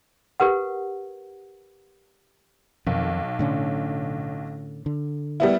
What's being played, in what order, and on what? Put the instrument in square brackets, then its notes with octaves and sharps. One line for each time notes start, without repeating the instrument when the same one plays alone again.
[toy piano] G4 A#4 B4 F#5
[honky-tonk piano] B1 [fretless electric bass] F2 D#3
[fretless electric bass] A2 D3 C#4
D3
[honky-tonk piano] G3 B3 E4